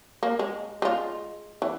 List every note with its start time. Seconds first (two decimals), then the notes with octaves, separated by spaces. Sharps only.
0.23 A#3
0.39 G#3
0.82 G#3 F4
1.62 E3